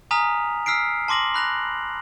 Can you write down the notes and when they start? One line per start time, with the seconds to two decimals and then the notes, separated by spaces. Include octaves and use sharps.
0.11 G#5 A#5 D#6 F6 B6 F7
0.66 E6 F6 B6 C7 D7
1.08 A5 C6 D6 A#6 F#7
1.34 B5 F#6 A#6 F7